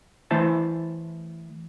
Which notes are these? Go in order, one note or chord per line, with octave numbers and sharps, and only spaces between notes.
E3 A3 E4 C5 E5 A5